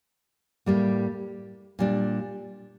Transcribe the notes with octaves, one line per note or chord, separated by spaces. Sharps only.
A2 G3 A#3
A#2 G3 D4